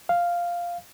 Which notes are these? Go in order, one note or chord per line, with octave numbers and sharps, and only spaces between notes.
F5